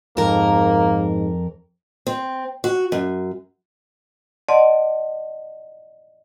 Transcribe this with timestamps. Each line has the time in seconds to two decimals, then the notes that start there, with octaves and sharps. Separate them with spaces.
0.17 F2 G#2 A#3 A#4
2.07 C4
2.64 F#4
2.92 F#2
4.49 D5 D#5 F#5 A5 C6